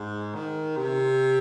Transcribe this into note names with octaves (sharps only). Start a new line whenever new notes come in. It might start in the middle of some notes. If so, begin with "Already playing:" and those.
Already playing: G#2
D#3
C3